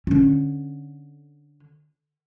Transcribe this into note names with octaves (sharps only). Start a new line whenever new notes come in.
D3 C#4